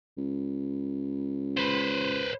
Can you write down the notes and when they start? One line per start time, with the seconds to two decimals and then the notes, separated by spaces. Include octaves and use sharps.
0.18 C#2
1.57 B4 C5